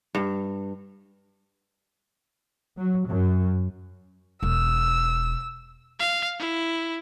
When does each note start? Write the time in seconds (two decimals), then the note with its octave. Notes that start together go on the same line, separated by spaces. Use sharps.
0.15 G2
2.77 F#3
3.07 F#2
4.43 E1 E6
6.00 F5
6.39 E4